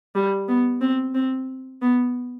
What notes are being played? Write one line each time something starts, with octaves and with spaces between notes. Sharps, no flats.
G3
B3
C4
C4
B3